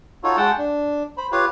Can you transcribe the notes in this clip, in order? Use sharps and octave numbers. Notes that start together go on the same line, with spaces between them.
D#4 F4 F#4 A4 C#5
G#3 F#5 G5 A5
D4
C5 B5
F4 G4 B4 C#5 F5